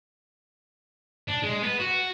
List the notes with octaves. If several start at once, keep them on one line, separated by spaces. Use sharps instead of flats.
D4
G#3
B3
F#4